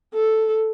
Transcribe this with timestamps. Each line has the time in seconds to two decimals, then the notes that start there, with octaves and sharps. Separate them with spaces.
0.14 A4